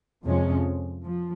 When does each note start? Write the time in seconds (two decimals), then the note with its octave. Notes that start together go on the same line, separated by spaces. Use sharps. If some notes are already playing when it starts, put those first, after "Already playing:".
0.25 F2 C3 F3 G#3 C#4
1.04 F3